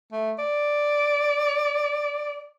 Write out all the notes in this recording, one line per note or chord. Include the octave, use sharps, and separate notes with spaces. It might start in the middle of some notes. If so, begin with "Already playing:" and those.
A3
D5